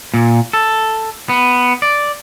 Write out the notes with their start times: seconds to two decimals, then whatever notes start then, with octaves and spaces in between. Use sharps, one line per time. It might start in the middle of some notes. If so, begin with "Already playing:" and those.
0.14 A#2
0.53 A4
1.29 B3
1.82 D5